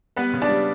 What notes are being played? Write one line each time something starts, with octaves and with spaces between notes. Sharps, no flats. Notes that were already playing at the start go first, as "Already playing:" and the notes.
G3 B3 B4
C#3
D4 D5
G3